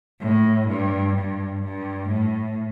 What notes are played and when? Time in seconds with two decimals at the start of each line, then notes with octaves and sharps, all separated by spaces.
0.21 A2
0.68 G2
1.15 G2
1.62 G2
2.09 A2